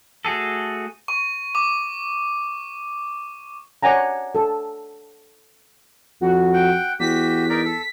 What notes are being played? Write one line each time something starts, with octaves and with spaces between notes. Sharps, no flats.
A3 F#4 G#4 A4
C#6
D6
C#5 D5 F#5 G#5 A#5
A4
F2 F#4
F#5 G5
E2 F#4 G4 B6
D#4 A#4 D5
A4